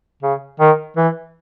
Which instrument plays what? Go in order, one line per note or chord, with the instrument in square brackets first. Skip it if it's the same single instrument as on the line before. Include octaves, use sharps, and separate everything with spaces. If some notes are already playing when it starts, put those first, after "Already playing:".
[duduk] C#3
D#3
E3